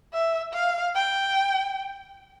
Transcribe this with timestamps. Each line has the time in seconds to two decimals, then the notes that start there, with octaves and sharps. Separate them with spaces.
0.13 E5
0.53 F5
0.95 G5